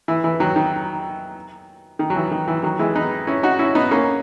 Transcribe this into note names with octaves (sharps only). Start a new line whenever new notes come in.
E3
E3
D#3 F#3
D#3
D#3
F#3
E3
D#3
E3
D#3 F#3
E3 G#3
B3 D#4
C#4 E4
D#4 F#4
C#4 E4
B3 D#4
A#3 C#4